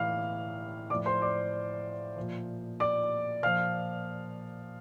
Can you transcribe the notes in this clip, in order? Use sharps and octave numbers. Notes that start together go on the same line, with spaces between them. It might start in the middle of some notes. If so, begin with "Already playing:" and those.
Already playing: A2 E3 F5 F6
A2 F3 D5 D6
C5 C6
D5 D6
A#2 F3
D5 D6
A#2 F3 F5 F6